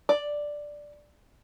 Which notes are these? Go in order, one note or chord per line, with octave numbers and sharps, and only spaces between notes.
D5